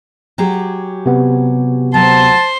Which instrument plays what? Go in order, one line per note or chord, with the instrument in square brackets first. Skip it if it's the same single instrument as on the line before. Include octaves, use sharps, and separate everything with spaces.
[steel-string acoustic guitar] F#3 G4 G#4
[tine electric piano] C3 B3
[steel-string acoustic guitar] D2 F#3 [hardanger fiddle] C5 C6 [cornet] A5